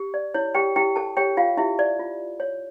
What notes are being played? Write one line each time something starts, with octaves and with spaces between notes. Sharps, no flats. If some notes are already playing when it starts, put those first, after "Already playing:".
Already playing: G4
D5
E4 C#5
G4 G5
E4 G4 G5
A4 A5
G4 C#5 G5
F4 F5
E4 G4 E5
D5
F4
C#5